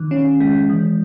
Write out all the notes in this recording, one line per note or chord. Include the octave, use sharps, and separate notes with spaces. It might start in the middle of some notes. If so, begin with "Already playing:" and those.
Already playing: D#3
C#4
G#3
E3